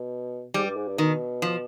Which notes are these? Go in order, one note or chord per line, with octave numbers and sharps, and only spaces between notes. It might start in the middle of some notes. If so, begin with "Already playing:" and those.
Already playing: B2
G#2 G3
G2
G#2
G2
B2 D#3
F3